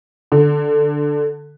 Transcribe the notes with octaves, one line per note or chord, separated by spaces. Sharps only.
D3